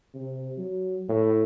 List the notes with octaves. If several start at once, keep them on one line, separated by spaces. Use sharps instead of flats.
C3
F#3
A2